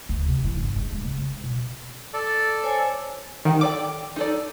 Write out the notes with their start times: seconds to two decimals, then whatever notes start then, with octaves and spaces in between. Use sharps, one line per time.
0.09 D2
0.26 C3
0.44 E3
0.57 G1
0.76 G#3
0.92 D1
1.05 C#3
1.18 G#3
1.44 B2
2.14 A4 D5
2.63 C5 C#5 G#5
3.45 D#3 G4 F#5 G5
3.61 A4 D5 G5 D6
4.16 D#4 A4 D5